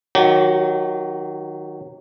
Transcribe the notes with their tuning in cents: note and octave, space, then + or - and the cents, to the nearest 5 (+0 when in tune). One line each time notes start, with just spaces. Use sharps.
D#3 +0 F#3 -5 G4 -35